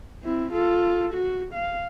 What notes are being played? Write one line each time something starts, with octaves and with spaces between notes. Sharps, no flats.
C4 E4
F4 A4
F#4
F5